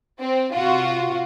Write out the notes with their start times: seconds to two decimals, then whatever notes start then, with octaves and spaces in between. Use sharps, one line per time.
0.20 C4
0.53 C3 F4 F#4